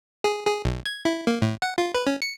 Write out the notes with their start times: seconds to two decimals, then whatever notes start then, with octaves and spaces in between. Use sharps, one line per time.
0.24 G#4
0.47 G#4
0.65 B1
0.86 G#6
1.05 E4
1.27 A#3
1.42 A2
1.62 F#5
1.78 F4
1.94 B4
2.07 C#4
2.22 C#7